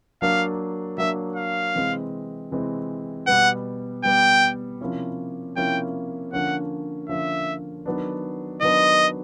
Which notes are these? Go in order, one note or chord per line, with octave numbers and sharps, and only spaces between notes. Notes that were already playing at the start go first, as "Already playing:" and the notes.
F#3 A#3 D4 F5
F#3 A#3 D4 E5
F5
C3 E3 G#3 C4
C3 E3 G#3 C4
B2 G3 B3 F#5
B2 G3 B3 G5
C3 F3 A#3 C#4 E4
C3 F3 A#3 C#4 E4 G5
D3 F3 A#3 C#4 F#5
D3 F3 A#3 C#4 E5
D#3 F#3 B3 D4
D#3 F#3 B3 D4 D#5